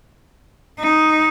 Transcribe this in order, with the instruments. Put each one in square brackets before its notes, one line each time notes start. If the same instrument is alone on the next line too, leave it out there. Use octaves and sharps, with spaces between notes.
[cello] D#4